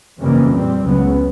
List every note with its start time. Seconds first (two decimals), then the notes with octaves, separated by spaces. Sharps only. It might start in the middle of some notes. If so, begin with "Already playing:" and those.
0.19 F2 C#3 E3 G3 A#3
0.51 A#2 G3 C4
0.84 C#2 C#3 F#3 B3